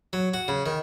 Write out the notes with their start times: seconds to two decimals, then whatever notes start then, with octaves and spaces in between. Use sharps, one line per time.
0.13 F#3
0.34 F#4
0.48 C#3
0.66 D#3